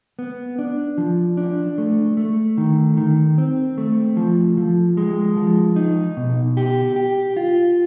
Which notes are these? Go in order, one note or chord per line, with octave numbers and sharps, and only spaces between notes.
B3
D4
F3
D4
A3
A3
D#3
D#3
C4
A3
F3
F3
G#3
F3
D#4
B2
G4
G4
F4